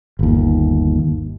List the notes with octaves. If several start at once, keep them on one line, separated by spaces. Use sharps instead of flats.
G1 D#2